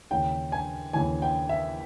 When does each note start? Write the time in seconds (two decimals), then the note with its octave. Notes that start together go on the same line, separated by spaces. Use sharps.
0.11 D#2 C#3 E3 G5
0.52 G#5
0.93 D#2 C#3 E3 G#5
1.22 G5
1.49 E5